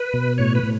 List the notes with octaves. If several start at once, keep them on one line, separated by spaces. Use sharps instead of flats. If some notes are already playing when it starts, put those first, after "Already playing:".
Already playing: B4
B2
A2 C#5
B4
A2